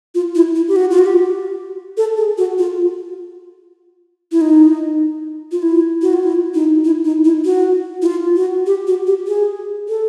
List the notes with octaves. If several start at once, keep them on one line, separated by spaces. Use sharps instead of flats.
F4
E4
E4
G4
F#4
F4
F#4
G4
A4
G#4
F#4
F4
E4
D#4
F4
E4
F#4
F4
E4
D#4
E4
D#4
E4
F#4
E4
F4
F#4
G4
F#4
G4
G#4
A4